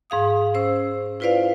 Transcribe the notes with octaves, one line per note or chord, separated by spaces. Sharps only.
G#2 G#4 F5 D#6
C#4 C5 E6
E4 F4 B4 C5 D5 F5